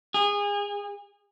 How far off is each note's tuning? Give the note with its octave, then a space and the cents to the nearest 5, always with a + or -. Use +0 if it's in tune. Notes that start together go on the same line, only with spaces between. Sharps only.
G#4 -25